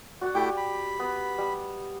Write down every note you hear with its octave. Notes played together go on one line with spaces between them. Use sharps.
F#4 D5 F#5
A3 E4 G4 G5
B5
B3
G3